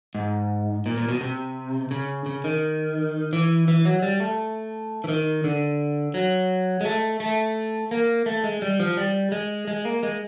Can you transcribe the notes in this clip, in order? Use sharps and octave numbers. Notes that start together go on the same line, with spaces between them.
G#2
A#2
A#2
B2
C3
C#3
C#3
D#3
E3
E3
F#3
G3
A3
E3
D#3
D3
F#3
G#3
A3
A3
A#3
A3
G#3
G3
F3
G3
G#3
G#3
A#3
G#3